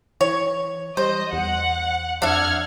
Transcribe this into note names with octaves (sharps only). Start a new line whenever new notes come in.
E3 C#5
G3 C5 D#5
E2 F#5
F2 D4 E5 F#5 F6 G#6